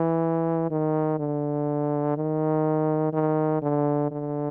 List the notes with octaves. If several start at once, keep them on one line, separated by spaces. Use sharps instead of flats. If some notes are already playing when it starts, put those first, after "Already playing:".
Already playing: E3
D#3
D3
D#3
D#3
D3
D3